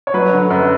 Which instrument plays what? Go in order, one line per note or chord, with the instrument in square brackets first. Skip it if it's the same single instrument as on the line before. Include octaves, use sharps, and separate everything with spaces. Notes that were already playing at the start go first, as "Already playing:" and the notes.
[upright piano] C#5
F#3 B4
D3
F#2 B4